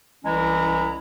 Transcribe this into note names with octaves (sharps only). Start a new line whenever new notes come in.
C2 E3 G#3 C#4 E4 A#5